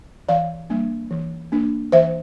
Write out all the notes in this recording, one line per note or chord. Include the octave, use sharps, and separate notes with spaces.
E3 D5 F5
G3 A#3 D4
E3
A#3 D4
E3 C5 E5